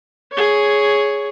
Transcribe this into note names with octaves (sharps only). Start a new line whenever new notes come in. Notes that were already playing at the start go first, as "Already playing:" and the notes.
G#4 C#5